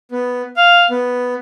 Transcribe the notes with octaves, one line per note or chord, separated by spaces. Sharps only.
B3
F5
B3